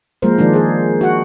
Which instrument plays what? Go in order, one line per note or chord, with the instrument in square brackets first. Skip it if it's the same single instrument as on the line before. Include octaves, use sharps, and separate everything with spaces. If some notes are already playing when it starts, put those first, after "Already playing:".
[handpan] F3 G#3 A#3 A#4 C5
D#3 F3 G#3 D4
G#4 C5
F#4 F#5